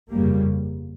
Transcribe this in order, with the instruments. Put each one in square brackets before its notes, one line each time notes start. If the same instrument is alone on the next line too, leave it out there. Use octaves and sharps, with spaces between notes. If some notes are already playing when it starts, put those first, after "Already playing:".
[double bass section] G1 F2 C#3 G3 A#3